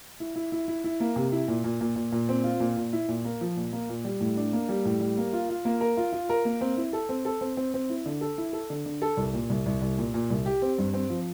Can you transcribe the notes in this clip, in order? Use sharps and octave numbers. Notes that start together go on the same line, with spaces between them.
E4
E4
E4
E4
E4
A#3
C3
E4
A#2
A#2
A#2
A#2
A#2
C4
F4
A#2
A#2
E4
A#2
A#3
F3
A#2
A#3
A#2
G3
A2
D4
A#3
G3
A2
G3
A#3
F4
F4
A#3
A#4
F4
F4
A#4
A#3
C4
E4
A4
C4
A4
C4
C4
C4
E4
D3
A4
E4
A4
D3
D3
A4
C2
A#2
C2
C2
C2
A#2
A#2
C2
G4
C4
G2
C4
F3